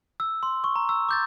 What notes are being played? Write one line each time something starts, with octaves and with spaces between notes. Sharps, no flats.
E6
C6
C#6
A#5
E6
D6 G6 A6